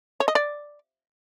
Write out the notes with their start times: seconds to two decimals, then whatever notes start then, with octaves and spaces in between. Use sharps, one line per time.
0.20 C#5
0.28 D#5
0.35 D5